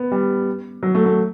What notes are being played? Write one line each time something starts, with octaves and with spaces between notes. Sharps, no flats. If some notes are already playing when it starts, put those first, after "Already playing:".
Already playing: B3
G3
F#3
A3
A3